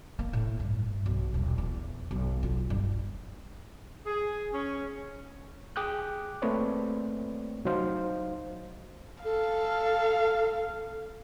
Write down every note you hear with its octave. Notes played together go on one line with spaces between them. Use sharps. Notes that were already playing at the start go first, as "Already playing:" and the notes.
A#3
A2
G2
B1
D#1
E2
B1
F4
G2
G#4
C#4
G#4 G5 D6 D#6 F#6 G6
A3 A#3 C4 B4 C#5 D5
C2 F#3 D#4 C5 F5
A4 F5